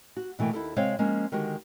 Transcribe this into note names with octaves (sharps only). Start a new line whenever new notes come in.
F#4
B2 E3 A3 A#3 G5
D#2 E4 A4
C3 G#3 C4 C5 C#5 F5
F3 G#3 A#3 C#4
D3 D#3 G#3 F#4 G4